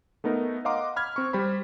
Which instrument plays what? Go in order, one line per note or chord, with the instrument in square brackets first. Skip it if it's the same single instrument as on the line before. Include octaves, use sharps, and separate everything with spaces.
[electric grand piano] A3 B3 D#4 A#4
D#5 F5 F#5 A#5 C6 D6
B5 F6 G#6
C4 C#6
G3 G4 C5 B5